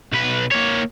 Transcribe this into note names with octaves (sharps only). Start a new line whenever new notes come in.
B1 B4
A#3 C#5